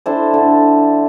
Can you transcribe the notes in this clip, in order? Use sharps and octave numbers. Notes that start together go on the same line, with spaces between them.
D4 E4 A4 C5
D3